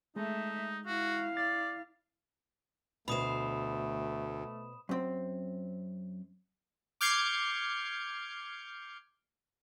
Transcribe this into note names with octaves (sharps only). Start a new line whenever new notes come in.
G#3 A3 D#4 E5
E4 F#4 F5
D5 A6
D2 B2 A3 C5 B5 D#6 E7
F#2 C4
D6 F6 G6 G#6 C7 C#7